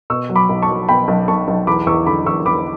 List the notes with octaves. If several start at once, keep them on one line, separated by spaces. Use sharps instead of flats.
B2 C#6 E6
F#3
B5 D6
B1
A5 C#6
F#3
B2 G5 B5
B1
B1 A5 C#6
B1
E2 B5 D6
E2 C#6 E6
D3 B5 D6
E2 C#6 E6
E2 B5 D6